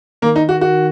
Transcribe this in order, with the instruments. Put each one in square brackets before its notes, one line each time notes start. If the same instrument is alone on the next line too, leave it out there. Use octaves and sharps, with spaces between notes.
[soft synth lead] D#3 [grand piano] A#3
[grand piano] D#4
F#4
F#4